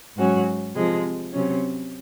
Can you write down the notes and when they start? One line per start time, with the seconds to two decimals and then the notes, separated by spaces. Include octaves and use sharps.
0.17 G#2 F#3 C#4 F#4
0.75 C3 F3 G#3
1.33 C3 F#3 C#4